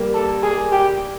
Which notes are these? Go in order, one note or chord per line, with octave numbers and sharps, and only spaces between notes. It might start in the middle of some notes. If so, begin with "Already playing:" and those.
Already playing: G3 A#3
A4
G#4
G4